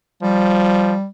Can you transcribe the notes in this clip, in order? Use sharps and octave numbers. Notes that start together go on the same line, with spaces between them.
F3 G3